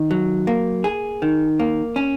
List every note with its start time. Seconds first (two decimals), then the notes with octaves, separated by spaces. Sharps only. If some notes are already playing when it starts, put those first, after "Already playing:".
Already playing: D#3
0.11 F#3
0.47 A#3
0.84 G#4
1.22 D#3
1.59 A#3
1.96 C#4